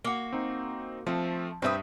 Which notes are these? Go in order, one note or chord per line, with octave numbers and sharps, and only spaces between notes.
A#3 F#4
C4 D#4
F3 A3 C4
G2 C4 D4 B4 E5 D#6